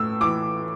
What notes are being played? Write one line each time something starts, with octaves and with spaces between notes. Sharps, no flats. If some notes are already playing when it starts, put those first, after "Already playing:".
Already playing: A2 E6
E3 D6